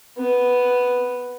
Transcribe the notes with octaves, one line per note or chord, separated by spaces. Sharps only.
B3